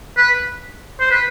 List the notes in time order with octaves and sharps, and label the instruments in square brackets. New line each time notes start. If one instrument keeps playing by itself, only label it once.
[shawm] B4
C5
B4